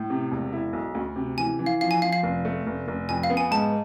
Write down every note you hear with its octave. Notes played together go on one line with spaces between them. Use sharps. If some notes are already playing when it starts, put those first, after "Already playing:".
Already playing: A2
C3
E1
E4
B1
D2
C3
E3 G#5
E3
F5
F3 F5
G#5
F3 F5
F5
F1
A3
F1
F1
F2 G#5
F5
B3
G#5
G#2 A5